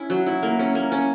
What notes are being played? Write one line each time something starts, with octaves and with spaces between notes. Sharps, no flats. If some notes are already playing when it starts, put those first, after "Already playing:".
Already playing: C#4 E4
F#3
E4
A#3
C#4
A#3
C#4